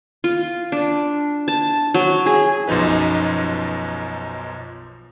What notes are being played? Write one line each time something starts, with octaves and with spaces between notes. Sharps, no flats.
F4
D4
A5
F#3
G#4
B1 F#2 F3 D#4 B4